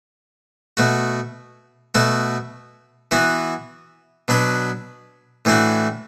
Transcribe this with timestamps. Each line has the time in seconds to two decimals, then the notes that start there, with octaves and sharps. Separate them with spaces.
0.77 B2 A3 F#4
1.95 B2 A3 F#4 A4
3.11 E3 B3 F#4
4.28 B2 F#3 D4 B4
5.45 A2 E3 A3 D4 F#4